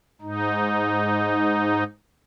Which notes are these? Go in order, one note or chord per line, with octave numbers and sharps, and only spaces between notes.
G#2 D#4